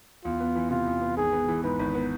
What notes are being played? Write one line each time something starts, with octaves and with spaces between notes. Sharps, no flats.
E2 F4
B3
E3
C3 F4
E2
B3
G#1 G#4
B3
E3
G#2 B4
G#1
B3